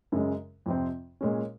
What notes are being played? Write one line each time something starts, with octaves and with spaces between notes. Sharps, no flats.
F#2 C#3 G#3
F2 C3 F3 C4
A#2 G#3 C#4